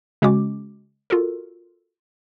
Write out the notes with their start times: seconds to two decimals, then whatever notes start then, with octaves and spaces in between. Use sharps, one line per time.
0.22 C#3 G#3 C#4 F#4 D6
1.10 F4 F#4 A4 A#4